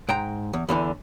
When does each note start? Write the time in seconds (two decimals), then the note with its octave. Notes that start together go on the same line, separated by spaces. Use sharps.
0.09 G#2 G5 A#5
0.53 E2
0.69 E2 D3 E3